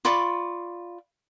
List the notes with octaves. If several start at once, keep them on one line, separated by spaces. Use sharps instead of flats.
F4 D5 B5 C#6